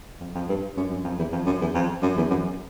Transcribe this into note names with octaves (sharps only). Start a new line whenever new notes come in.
F2
F2
G2
F#2
F#2
F2
E2
F2
F#2
E2
F2
F#2
E2
F#2